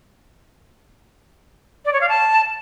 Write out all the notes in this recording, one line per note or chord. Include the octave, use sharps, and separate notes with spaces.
D5
C#5
F5
A5